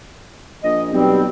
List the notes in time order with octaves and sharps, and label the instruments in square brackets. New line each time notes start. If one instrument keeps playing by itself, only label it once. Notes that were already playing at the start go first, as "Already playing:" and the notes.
[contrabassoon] A#1 [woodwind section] D#5
[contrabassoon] B1 [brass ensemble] B2 G3 [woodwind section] C4